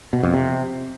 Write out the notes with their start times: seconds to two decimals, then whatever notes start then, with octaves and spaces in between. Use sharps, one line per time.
0.13 B2
0.23 F2
0.34 C3